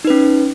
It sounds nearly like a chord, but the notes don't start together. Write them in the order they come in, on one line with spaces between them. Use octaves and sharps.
D#4 B4 C#4